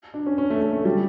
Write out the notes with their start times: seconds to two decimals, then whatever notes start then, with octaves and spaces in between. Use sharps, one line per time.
0.14 D4
0.26 C#4
0.38 C#4
0.50 A3
0.62 A3
0.73 A3
0.85 G3